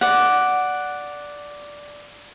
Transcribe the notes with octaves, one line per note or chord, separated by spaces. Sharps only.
D5 F#5